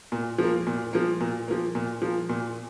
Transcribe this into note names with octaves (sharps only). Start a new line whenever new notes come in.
A#2
F3 A#3
A#2
F3 A#3
A#2
F3 A#3
A#2
F3 A#3
A#2